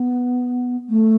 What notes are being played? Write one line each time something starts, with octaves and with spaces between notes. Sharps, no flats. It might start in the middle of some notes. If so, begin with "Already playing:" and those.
Already playing: B3
A3